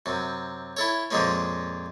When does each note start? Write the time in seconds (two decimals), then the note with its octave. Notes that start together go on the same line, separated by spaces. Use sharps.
0.06 F#2 C3
0.77 E4 A4 C#5
1.11 F2 A#2 F3 G#3 A#3 C#4